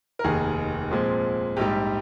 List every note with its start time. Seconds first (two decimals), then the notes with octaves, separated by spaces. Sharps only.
0.19 A#4
0.24 F1 D#2 D#3 G#4
0.91 A#2 F3 G#3 C4
1.57 A#1 G#2 G3 G4